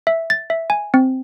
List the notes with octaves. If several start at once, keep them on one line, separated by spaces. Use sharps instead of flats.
E5
A6
E5
G#5
C4